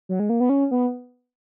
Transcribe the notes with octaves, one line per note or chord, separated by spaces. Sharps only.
F#3
G#3
A#3
B3
C#4
B3